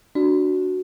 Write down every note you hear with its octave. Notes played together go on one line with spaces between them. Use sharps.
D4 F#4